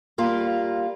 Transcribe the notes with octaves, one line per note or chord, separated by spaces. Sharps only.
G3 A#3 F4